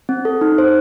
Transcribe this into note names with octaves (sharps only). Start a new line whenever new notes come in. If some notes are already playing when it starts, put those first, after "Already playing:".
C4
A4
D#4
C5